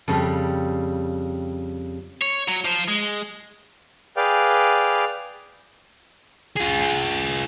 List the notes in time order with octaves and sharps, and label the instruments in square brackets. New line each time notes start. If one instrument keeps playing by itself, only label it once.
[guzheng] F2 C#3 G3
[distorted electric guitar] C#5
F#3
F3 C5
G#3
[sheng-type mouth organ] G#4 B4 D5 F5 G5
[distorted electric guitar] F4 G#4